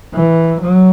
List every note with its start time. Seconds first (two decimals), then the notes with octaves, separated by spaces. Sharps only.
0.14 E3
0.62 F#3